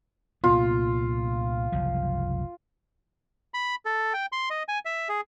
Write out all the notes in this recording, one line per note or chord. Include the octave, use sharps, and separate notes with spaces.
C2 A#2 B3 F4
F#1 C2 F3
B5
A4
G5
C6
D#5
G#5
E5
G#4